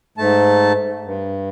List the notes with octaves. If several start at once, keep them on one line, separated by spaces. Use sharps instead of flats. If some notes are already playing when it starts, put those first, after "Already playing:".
G#2 A3 A5
G2